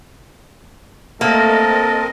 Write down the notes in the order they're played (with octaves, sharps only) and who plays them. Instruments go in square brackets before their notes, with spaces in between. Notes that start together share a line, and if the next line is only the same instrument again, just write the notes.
[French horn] A3 [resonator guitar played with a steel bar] A#3 [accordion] C4 A#4 D#5 [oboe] A4